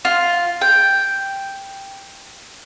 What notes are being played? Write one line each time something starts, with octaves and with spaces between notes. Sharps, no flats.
F4
G5